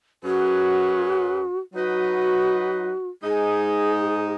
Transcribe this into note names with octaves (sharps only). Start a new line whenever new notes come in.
F#2 F#3 C#4 F#4 G#4 B4
F#3 D#4 F#4 B4 D#5
G#2 G#3 D#4 G#4